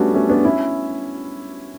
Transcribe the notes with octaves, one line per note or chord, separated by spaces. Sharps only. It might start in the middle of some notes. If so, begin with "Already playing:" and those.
Already playing: G3 A3 B3 C#4 D4 F#4
A3 C#4
B3 D4
C#4 E4